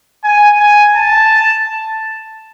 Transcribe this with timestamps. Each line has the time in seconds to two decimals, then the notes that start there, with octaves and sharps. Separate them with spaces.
0.24 G#5
0.59 G#5
0.96 A5